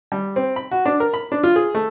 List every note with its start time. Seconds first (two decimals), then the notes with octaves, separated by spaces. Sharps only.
0.12 G3
0.36 C4
0.56 B5
0.71 F#4
0.86 D4
1.00 A#4
1.14 B5
1.32 D4
1.44 F4
1.56 G#4
1.75 A3